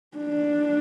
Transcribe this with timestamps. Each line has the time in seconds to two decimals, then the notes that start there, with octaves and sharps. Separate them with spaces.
0.17 D4